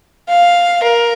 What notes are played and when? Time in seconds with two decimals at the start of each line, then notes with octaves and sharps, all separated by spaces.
0.29 F5
0.83 A#4